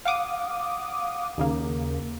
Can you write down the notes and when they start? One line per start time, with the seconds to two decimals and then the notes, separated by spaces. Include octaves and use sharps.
0.05 F5 F#5 D6 D#6
1.38 D#2 C#3 A#3